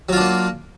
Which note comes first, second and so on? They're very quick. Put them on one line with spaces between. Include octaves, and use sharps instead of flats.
F#3 F4 D4 A#3